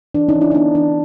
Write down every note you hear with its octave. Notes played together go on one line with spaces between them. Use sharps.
E3 D4
C#4 D#4
E3
D4 E4
D#4
B3 D4
E3 D4